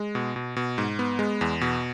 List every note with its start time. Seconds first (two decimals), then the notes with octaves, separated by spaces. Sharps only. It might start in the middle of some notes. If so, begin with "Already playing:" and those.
Already playing: G#3
0.15 B2
0.36 B2
0.56 B2
0.78 G#2
0.99 B3
1.19 G#3
1.41 E2
1.61 B2